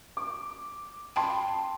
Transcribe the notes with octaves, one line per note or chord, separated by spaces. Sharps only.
D6
G5 A5 B5 C6